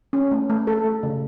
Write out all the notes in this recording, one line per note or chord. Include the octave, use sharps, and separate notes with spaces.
C#4
A3
A3
A4
A3
C#3